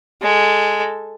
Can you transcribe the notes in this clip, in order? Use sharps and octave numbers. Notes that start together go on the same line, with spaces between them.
G#3 A4